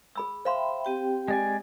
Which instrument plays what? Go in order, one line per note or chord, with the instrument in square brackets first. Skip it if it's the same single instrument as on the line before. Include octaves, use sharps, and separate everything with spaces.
[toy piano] G#4 B5 E6
[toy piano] C5 F5 C6 [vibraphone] E5 G5 B5
[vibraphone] C4 G4 G5
[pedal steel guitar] G#3 D5 G#5